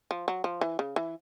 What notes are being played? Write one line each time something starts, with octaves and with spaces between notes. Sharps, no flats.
F3
F#3
F3
E3
C#3
E3